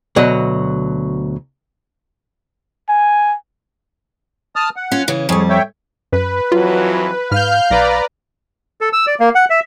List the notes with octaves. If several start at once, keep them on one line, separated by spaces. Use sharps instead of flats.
D2 B2 F#3 D#5
G#5
A5 D#6 F6
F#5
C#4 F4
C#3 E3 C#4
F2 G3 G#4 C#5
C#5 E5 G5
F#2 B4
F2 E3 F#3 F4
G#2 F5 F6 G6
B1 B4 D5 A#5
A4
E6
D5
A#3
F#5
E5